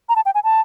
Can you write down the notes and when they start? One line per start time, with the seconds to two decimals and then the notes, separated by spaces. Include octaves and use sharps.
0.09 A#5
0.16 A5
0.26 G5
0.35 G#5
0.44 A5